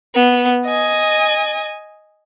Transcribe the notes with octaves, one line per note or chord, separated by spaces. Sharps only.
B3
D#5 G#5